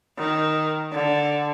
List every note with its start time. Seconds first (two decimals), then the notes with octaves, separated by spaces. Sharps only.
0.18 D#3
0.92 D3